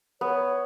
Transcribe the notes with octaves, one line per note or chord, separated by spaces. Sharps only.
B3 C#5